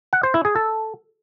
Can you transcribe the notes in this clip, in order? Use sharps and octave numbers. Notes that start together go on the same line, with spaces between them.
F#5
C5
E4
G#4
A4